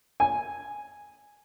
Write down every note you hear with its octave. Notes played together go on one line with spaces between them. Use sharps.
G#5